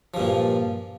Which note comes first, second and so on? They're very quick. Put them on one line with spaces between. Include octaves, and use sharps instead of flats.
F3 G2 A#2